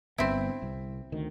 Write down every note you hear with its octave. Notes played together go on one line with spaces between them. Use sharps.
G1 G2 B3 C4 E4
C2
D2 D#3